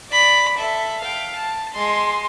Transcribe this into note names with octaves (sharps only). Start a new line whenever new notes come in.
D5 B5
A4 E5
F5 G5
A5
G#3 C6